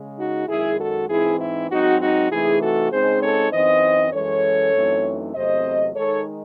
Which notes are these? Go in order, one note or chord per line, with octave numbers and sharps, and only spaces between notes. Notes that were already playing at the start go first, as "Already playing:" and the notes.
Already playing: C#3 G#3
D#4 F#4
F#2 D#3 G#3 E4 G#4
F#4 A4
G#2 E3 C4 D#4 E4 G#4
E4
G#2 F#3 C4 D#4 F#4
D#4 F#4
C3 E3 A3 D#4 E4 G#4
F#4 A4
C#3 G#3 C4 D#4 G#4 C5
A4 C#5
F#2 E3 C4 D#4 C5 D#5
F#2 E3 G#3 C#4 A4 C#5
F#2 E3 A3 C4 D#4
E2 C3 F#3 A3 C4 C5 D#5
D#3 G#3 D#4 A4 C#5